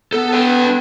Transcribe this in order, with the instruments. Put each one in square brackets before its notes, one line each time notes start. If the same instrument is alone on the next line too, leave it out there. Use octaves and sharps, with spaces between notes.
[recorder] B3 [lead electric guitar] A4
[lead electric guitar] B4 G5
[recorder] D4